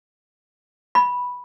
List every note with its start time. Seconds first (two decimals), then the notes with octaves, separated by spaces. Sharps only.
0.95 B5